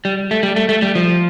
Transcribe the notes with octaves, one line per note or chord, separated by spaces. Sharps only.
G3
A3
G3
A3
A3
G3
F3